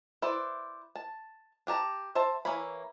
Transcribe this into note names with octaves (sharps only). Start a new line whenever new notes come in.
E4 B4 C5 D5
A5
D4 G4 A5 A#5
C5 E5 A5
E3 A#3 E4 C#5 B5